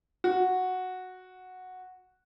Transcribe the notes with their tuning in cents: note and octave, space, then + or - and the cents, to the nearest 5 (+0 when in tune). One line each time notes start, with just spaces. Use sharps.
F#4 -5